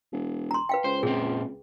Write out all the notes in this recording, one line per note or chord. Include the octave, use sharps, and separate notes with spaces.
E1
A#5 C6
B4 F5 G5
C#2 C5
A#2 C4 G#4